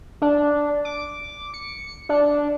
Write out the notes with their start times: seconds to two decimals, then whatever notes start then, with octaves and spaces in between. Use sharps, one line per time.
0.22 D4
0.85 D6
1.54 C#7
2.09 D4